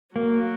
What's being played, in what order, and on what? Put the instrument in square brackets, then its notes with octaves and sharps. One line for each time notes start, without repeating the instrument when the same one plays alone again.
[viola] F#3 [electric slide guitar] A#3